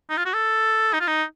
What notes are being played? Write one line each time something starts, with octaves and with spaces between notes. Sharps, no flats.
D#4
F4
F#4
A4
D#4
F4
D#4